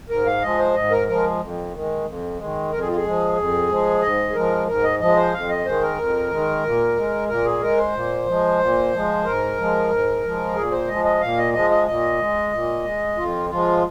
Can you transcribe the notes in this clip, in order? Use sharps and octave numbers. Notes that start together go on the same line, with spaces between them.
G#2 A#4
F5
F3 G#3 D#5
C5
G#2 D#5
A#4
F3 G#3 A#4
F2
D#3 G#3
F2
D#3 G#3
F2 A#4
G#4
F4
G#4
F3 G#3
F2
F3 G#3
G#2 D#5
G#4
F3 G#3 A#4
G#2 A#4
D#5
F3 G#3 D#5
C5
F2 F5
D#5
D#3 G#3 C5
A#4
F2
D#3 G#3
A#2
G#3
A#2 A#4
G#4
G#3 A#4
C5
A#2
F3 G#3
A#2
F3 G#3
G#2 A#4
F3 G#3
G#2
F3 G#3
A#2 G#4
C5
F3 G#3 D#5
D#5
A#2 F5
D#5
F3 G#3 D#5
D#5
A#2 D#5
G#3
A#2
G#3
F2 F4
F3 G#3 F4